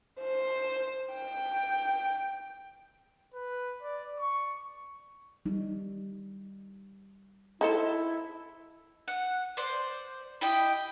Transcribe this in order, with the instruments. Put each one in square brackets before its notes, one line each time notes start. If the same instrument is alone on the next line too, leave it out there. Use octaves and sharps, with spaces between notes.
[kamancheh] C5
G5
[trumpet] B4
D5
C#6
[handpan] G3 D#4
[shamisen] D#4 A4 C5 [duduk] E4
[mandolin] F#5
C5 D5
E4 G4 D#5 G5